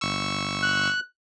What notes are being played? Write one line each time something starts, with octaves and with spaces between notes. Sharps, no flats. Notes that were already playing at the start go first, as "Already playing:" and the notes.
G1 C#6 E6
F#6